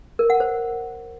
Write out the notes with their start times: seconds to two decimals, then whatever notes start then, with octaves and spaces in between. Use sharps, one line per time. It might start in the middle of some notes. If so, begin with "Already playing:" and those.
0.19 A#4
0.30 F#5
0.40 C5